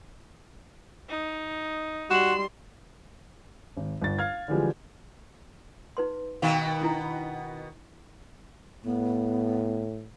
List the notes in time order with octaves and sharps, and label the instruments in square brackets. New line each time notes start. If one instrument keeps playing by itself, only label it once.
[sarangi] D#4
[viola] G3 C6 [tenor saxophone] F#4 [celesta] E7 F#7
[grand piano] G#1
G1 A6
F5 F6 G#6
D3 E3 F3 G3 G#3
[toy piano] D#4 B4 C6
[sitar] B2 D#3 B3 [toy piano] F5 C6
[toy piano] D4 E4 A#5
[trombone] A2 [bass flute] B3